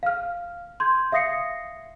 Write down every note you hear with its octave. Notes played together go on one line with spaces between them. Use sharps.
F5 F6
C6 G6 G#6
E5 F5 D#6 A#6 C7 C#7